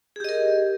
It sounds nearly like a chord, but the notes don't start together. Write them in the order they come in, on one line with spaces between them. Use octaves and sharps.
G#4 G4 D#5 A#4